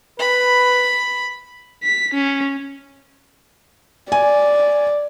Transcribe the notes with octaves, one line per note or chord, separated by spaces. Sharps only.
B4 B5
B6
C#4
D5 G#5